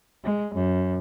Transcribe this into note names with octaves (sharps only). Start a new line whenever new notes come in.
G#3
F#2